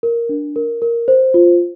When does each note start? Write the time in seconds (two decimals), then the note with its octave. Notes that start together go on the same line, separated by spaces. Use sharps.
0.03 A#4
0.29 D4
0.56 A#4
0.82 A#4
1.08 C5
1.34 F4